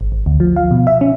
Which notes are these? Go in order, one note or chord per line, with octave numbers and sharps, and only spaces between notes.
G#1
G#1
D2
F3
F5
B2
E5
C#4